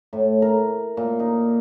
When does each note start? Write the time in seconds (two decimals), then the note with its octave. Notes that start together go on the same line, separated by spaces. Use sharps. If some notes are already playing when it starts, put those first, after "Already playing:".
0.13 A2
0.42 A#4
0.97 A#2
1.19 D#4